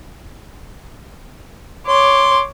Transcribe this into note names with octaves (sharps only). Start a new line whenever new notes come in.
C#5 C6 D6